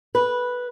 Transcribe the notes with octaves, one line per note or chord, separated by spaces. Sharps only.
B4